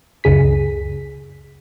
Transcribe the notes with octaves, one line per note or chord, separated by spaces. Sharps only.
C#2 F#2 C#3 G#4 B6